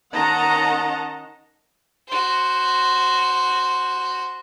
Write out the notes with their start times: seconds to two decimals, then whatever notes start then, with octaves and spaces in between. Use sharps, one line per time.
0.14 D#3 C#4 D#5 F#5 A5 A#5
2.08 F#4 C5